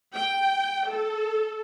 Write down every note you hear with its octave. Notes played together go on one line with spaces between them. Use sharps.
G5
A4